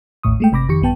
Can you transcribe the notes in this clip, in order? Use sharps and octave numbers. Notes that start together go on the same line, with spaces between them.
A1 D#2 A2 C#6 D#6
G#3 A3 G5
G1 C3 B5 D6 A#6
F2 D#3 G4 C#6 C#7
A#1 G2 B3 G5 A5